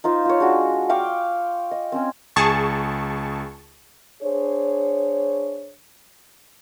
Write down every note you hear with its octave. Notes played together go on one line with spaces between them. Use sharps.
D#4 F4 C5
F4 C#5
G#3 D4 F#4
F5 G5 C#6 D6
D#5
C4 C#4 G#5
C#2 G#4 A5 C#6
D4 G#4 C5 C#5